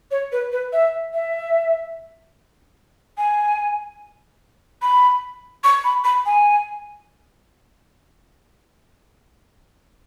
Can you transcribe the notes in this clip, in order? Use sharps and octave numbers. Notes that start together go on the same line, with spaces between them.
C#5
B4
B4
E5
E5
G#5
B5
C#6
B5
B5
G#5